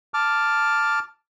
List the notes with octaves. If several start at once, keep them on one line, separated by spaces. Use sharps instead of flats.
A5 D6 F6